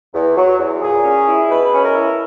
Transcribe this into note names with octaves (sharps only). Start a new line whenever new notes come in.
E2
F#3
E2
A#2 G#4
C#4
E4
B2 B4
C#4
A#4
E4